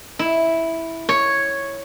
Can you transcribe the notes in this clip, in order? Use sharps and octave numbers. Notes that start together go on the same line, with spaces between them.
E4
C#5